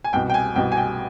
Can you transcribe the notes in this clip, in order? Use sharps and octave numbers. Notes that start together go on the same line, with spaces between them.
G#5
C2 B2 G5
G5
G#5
C2 B2 G5
G#5
G5